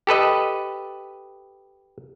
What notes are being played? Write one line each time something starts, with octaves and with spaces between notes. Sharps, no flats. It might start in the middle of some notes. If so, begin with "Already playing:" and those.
G4 A4 B4 D#5